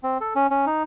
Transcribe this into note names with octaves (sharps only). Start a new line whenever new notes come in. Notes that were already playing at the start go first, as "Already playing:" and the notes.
C4
A4
C#4
C#4
D#4